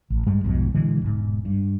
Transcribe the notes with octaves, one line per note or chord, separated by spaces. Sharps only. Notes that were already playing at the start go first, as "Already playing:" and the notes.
A1
G2 G3 G#3
B1 F2 G#2 B2
A#2 D3 E3 G#3
E1 G#2
G2